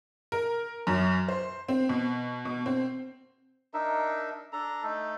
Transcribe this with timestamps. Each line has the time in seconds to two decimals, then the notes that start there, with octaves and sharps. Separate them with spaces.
0.32 A#4
0.87 F#2
1.28 C5
1.68 C4
1.89 B2
2.45 B2
2.66 C4
3.74 D4 D#4 A#4 E5
4.53 D4 A4 A#5
4.84 A3 D#4 A4